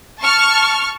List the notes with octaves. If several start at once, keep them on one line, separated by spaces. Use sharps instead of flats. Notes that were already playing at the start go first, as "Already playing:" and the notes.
A5 C#6 F6